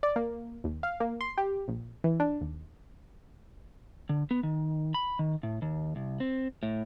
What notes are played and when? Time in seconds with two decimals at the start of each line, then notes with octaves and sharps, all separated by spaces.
0.03 D5
0.16 A#3
0.64 D#2
0.83 F5
1.00 A#3
1.21 C6
1.38 G4
1.68 A#1
2.04 E3
2.20 D4
2.41 D#2
4.09 D3
4.31 B3
4.43 D#3
4.94 B5
5.19 D#3
5.43 A2
5.62 D#2
5.96 C2
6.20 C4
6.63 A2